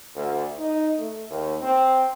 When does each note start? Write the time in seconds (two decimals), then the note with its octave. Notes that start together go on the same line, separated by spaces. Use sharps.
0.16 D2
0.59 D#4
0.98 A3
1.30 D#2
1.62 C4